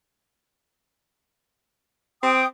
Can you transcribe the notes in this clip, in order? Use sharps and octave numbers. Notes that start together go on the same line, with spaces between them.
C4 G5 D#6